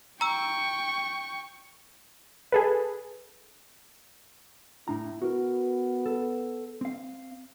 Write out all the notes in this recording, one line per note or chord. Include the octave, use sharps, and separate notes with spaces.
G5 A#5 C#6 E6
G#4 A4 B4
A2 D4 E4 A#5
B3 F#4 A#4
A4
C4 F5